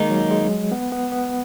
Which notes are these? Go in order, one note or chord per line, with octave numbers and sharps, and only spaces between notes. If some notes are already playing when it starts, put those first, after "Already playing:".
Already playing: D#3 G#3 A#3 D#4
F#3
G#3
B3
B3
B3